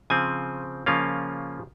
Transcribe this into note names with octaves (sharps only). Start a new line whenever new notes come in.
C#3 F3 C4 G#5
C#3 F3 A#3 C#4 F4 F5